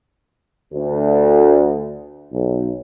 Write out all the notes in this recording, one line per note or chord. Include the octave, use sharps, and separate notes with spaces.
D2
B1